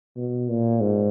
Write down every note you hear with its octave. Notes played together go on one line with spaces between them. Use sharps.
B2
A#2
G#2